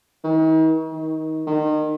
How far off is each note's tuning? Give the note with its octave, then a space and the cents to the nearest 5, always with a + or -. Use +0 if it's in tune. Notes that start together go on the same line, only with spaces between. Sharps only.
D#3 +45
D#3 +25
D#3 -25